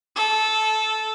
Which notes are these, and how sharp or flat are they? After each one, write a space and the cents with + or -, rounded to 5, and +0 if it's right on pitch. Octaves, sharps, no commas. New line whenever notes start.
A4 -15